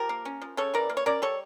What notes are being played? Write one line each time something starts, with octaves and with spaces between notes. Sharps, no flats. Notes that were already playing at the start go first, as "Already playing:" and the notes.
Already playing: F3 G4 A#4
A#3
C#4
F3
C#3 A4 C#5
E3 A#4 D5
A#3
C#5
C#4 A#4 D5
G3 A4 C#5